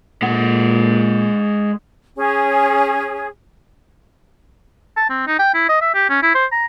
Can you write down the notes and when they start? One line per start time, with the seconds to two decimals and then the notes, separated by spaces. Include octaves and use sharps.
0.22 A#2 G#3 F#5
2.16 C#4 G#4
4.97 A5
5.10 C4
5.27 D#4
5.39 G5
5.54 E4
5.69 D#5
5.82 E5
5.94 G4
6.10 C#4
6.23 E4
6.35 C5
6.52 A#5